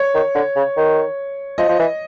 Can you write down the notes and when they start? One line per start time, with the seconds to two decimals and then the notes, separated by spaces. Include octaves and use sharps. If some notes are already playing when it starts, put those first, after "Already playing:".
Already playing: C#5
0.14 D#3
0.35 D3
0.56 C#3
0.77 D#3
1.58 F3 D#5
1.69 F3
1.79 E3